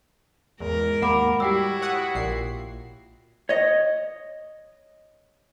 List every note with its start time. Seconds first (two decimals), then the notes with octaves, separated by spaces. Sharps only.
0.60 E2 G#2 A#4
1.02 D#2 A#3 F#5 B5 D6
1.40 G3 E4 F#4 G4 G5 E6
1.81 C#5 F#5 D#6
2.15 A#1 A#2 C7
3.49 C#5 D#5